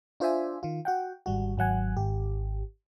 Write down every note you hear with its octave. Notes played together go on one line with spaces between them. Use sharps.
D4 F4 C5 D5 E5 G#5
D#3 F4
F#4 F#5 G5
G#1 G3 F#4
G#1 F#3 F#5 G#5
G#1 G4